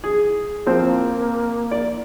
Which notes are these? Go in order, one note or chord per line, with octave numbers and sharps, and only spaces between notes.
G#4
F3 A#3 C4 C5
D5